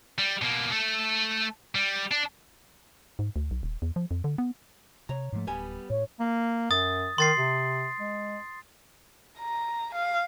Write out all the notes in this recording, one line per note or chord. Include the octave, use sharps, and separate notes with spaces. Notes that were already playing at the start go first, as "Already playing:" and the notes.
G3
B2 A#3
A3 A4
G3
D4
G#2
D2
B1
D#1
E2
F3
F2
D3
B3
C3 C#5 A#5
G#2 F3 A3
D1 G3 B3 G#5
A2 C#5
A#3
F#2 D#6 A6
D#3 C6 A6 C7
C3
G#3
A#5
F5